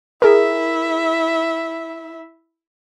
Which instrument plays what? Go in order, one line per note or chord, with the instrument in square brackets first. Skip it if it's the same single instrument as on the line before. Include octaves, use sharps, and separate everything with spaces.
[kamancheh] E4 E5 [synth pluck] G#4 A#4